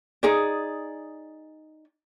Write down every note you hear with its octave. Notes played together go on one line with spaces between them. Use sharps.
D#4 G#4 D5